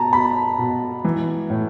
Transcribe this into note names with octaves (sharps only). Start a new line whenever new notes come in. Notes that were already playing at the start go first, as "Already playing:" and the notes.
Already playing: B2 A5 A#5
B2 B5
B2
E3
A2